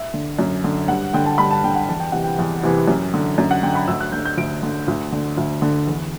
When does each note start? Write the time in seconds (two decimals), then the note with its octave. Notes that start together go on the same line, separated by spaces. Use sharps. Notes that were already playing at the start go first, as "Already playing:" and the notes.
Already playing: E5
0.14 D3
0.39 F#2
0.64 D3
0.88 G2 F#5
1.14 D3 G5
1.26 A5
1.38 G2 B5
1.51 A5
1.64 D3 G5
1.75 F#5
1.88 E2 A5
2.00 G5
2.12 C3 E3 F#5
2.24 G5
2.39 E2
2.63 C3 E3
2.88 F#2
3.14 D3
3.38 F#2
3.51 F#5
3.63 D3 G5
3.75 B5
3.88 D2 E6
4.01 F#6
4.12 D3 G6
4.25 G6
4.38 D2 D7
4.63 D3
4.88 D2
5.12 D3
5.37 D2
5.62 D3
5.87 E2